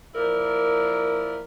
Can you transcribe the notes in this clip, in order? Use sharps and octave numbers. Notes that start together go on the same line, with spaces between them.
F3 A#3 E4 A#4 D5